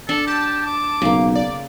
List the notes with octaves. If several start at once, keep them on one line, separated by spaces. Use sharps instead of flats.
D4 A4
G4 A5
D6
B1 C#3 A#3
D5